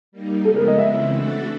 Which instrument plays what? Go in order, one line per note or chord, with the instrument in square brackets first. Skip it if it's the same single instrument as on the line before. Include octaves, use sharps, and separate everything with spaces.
[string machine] G3 A#3 D#4
[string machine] F#2 C#3 F3 G#3 B3 [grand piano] A4
[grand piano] A#4
D#5
[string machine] C#3 E3 G#3 C4 E4 [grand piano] E5
[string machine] E3 A3 D4 F#4 A4